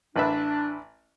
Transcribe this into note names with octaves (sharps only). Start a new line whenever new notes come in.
A1 D4 B4 E5